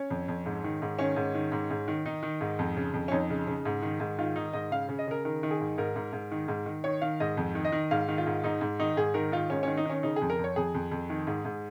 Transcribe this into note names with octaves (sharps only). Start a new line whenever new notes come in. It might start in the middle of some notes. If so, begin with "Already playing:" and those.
Already playing: C#4
F2
F2
G#2
D#3
G#2
D#3 C#4
G#2
D#3
G#2
G#2
D#3
D#3 D#4
D#3
G#2
F2
C#3
F2
C#4
F2 D#4
C#3
C#3
G#2
D#3
G#2
D#3 F4
D#3 D#4
G#2 D#5
C#3 F5
C#3
D#5
C#3 A#4
D#3 A#4
D#3
G#4
G#2
G#2 A#4
G#2
G#2
D#3
G#2
D#3
D#3 C#5
D#3 F5
G#2 D#5
F2
D#3
D#5
D#3
G#2 F5
D#3
F4
G#2
G#2 D#4
G#2
D#3 D#4
G#2 G#4
D#3 A#4
D#3 F4
G#2 C#4
D#3 C#4
D#4
D#3 C#4
C#3 D#4
G#4
F2
A#4
F2
C#5
F2 G#4
F2
F2
D#3
G#2
G#2